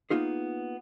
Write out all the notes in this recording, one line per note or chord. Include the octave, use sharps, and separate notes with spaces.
A#3 B3 D#4 F4 G#4